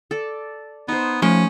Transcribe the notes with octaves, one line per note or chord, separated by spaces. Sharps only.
A4 D5
B3 D#4 C5
F3 A3 C#4 C6